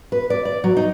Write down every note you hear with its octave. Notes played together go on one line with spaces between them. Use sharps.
B4
D5
D5
F#3
D#4